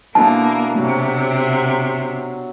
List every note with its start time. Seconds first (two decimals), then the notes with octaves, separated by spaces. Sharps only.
0.15 B2 D3 E3 A#3 A5
0.77 C3 F#3